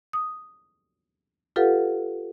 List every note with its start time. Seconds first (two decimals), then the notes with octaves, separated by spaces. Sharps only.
0.13 D#6
1.56 F4 G4 A4 B4 F5 F#5